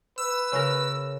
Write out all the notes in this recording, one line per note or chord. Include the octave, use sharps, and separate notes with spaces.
B4 E6
C#3 A#4